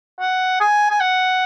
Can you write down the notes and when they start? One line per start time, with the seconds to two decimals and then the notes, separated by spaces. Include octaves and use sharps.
0.20 F#5
0.60 G#5
0.90 G#5
1.01 F#5